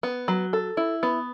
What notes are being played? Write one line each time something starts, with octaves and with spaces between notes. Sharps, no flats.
B3
F#3
A4
E4
B3